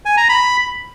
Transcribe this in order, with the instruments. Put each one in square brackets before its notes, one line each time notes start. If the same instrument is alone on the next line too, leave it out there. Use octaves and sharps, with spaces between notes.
[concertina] G#5
A#5
B5